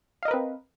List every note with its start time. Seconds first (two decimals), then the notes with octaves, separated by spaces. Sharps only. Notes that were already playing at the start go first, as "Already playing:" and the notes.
0.23 F5
0.25 D#5
0.28 A#4
0.31 B4
0.34 C4